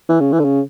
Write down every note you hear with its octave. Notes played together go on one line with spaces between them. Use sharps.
E3
C#3
E3
D3
C#3